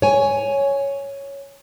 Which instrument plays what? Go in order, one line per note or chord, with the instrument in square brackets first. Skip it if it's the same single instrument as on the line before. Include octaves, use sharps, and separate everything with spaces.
[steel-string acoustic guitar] C#5 G#5